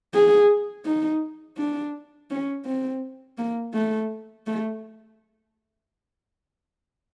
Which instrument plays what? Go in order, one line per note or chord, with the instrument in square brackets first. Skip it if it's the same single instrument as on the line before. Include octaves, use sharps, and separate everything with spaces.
[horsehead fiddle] G#4
D#4
D4
C#4
C4
A#3
A3
A3